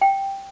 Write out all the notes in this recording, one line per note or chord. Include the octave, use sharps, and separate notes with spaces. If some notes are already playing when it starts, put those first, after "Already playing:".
G5